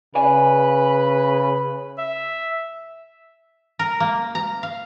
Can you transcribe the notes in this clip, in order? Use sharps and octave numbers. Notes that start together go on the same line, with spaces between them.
C#3 B4 D5 F5 G#5
E5
A#4
A#3
A#5
F5